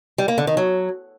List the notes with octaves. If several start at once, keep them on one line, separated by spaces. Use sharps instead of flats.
G3
A#3
D3
D#3
F#3